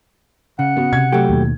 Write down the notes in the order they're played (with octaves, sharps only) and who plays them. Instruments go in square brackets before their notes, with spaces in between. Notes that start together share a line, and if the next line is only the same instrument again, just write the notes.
[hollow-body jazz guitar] C#3 [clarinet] F#5
[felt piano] B3 F#4
[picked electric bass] C3 [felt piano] G#6
[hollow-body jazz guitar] F#3 G4 [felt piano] A3
[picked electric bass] D#2 B2